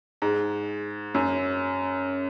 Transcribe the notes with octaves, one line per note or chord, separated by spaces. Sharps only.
G#2
F#2